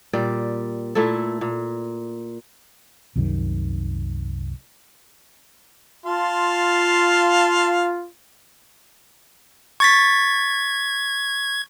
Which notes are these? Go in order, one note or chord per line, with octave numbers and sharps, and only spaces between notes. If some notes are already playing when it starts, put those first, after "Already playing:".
A#2 G3 D5
A#2 A3 E4 A4
A#2
C2 F#2 C3 D#3
F4 F5 A5 C6
C#6 G#6 A6 B6